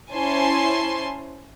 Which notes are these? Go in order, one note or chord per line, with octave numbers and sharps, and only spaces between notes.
C#4 E4 C5 G#5 A5 C6